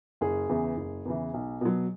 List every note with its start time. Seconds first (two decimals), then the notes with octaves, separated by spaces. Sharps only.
0.21 F#1 G#4
0.49 E2 C#3 E3
0.77 F#1
1.05 E2 C#3 E3
1.34 B1
1.61 B2 F#3